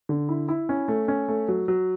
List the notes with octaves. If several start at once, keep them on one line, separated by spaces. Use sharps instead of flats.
D3
E4
E4
C#4
A3
C#4
A3
F#3
F#3